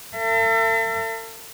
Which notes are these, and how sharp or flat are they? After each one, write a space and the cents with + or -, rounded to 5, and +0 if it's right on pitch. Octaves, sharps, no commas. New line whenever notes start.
A4 +40 E5 +40